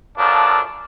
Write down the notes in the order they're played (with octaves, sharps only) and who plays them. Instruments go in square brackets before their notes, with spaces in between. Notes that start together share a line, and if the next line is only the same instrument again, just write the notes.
[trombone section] F#2 F3 A#3 D4 A4